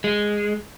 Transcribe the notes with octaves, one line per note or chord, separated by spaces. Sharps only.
G#3